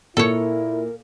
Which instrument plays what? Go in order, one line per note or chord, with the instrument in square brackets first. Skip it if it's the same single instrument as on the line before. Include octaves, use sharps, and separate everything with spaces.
[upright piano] A#2 [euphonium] E4 [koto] A4 C#5 [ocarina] A#4